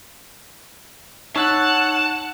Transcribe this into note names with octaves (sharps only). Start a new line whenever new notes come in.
D#4 C#5 F#5 A5 E6 F#6